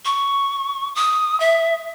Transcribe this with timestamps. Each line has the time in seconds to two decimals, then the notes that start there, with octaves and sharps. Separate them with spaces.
0.05 C#6
0.95 D#6
1.40 E5